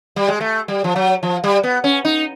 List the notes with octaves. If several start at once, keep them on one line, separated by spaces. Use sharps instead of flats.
G3
G#3
A3
G3
F3
F#3
F3
G3
B3
C#4
D#4